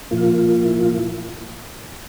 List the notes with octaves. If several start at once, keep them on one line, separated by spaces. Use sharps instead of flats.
A#2 F3 A#3 F4
F4
E4
F4
E4